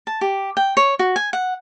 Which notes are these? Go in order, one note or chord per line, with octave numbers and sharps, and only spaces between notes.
A5
G4
G5
C#5
F#4
G#5
F#5